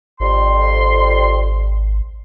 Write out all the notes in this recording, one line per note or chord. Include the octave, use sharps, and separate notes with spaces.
G#1 F2 G3 C6